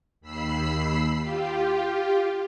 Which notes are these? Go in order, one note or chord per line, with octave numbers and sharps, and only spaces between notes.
D#2 B5 E6 C7
F4 G4